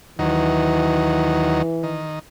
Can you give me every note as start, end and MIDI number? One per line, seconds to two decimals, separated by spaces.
0.19 1.62 39
0.19 1.62 51
0.19 2.05 52
0.19 1.62 54
1.83 2.19 51